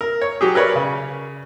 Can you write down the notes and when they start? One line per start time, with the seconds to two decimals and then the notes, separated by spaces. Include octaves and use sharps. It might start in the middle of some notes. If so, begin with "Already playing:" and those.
0.01 A#4
0.22 C#5
0.41 F#3 G4 G#4
0.55 A#4 B4 C#5 D5
0.76 C#3